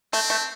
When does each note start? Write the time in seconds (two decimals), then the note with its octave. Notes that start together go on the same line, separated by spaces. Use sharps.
0.13 A3 C4
0.30 A3